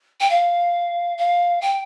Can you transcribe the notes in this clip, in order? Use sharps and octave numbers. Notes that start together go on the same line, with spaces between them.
G5
F5
F5
G5